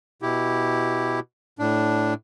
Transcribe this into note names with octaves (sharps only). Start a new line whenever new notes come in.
B2 E4 G4
A2 D4